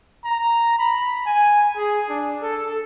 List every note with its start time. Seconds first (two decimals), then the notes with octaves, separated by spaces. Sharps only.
0.25 A#5
0.79 B5
1.26 G#5
1.77 G#4
2.10 D4
2.42 A4